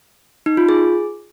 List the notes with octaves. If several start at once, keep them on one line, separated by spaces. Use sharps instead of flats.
D#4
F4
G#4